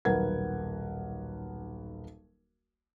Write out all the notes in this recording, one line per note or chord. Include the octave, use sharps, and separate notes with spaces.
D#1 B1 A#4 B4 F#5 G#6